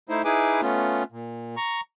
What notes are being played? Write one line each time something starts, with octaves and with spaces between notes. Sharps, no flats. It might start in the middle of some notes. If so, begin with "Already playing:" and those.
A3 D#4 E4 C5
D#4 E4 G#4 B4 G#5 D6
A3 B3 C#4 F4
A#2
A#5 C#6